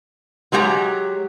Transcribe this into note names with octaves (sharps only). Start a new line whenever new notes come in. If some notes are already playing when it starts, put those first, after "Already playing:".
F#3 G#3 G4 F#5 A#5